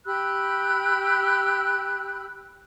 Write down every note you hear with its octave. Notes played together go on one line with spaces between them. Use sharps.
G4 B5 E6 F#6